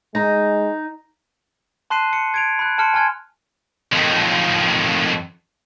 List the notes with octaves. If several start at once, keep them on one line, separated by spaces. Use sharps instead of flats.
G#3 D#4 A#5 A#6
A5 C6 F#6 C7 D#7
C#7
G#6 D7 F7
B5 F#6
A5 C6 F6 C#7
G#5 A5 C6 F6 G#6
F2 D#3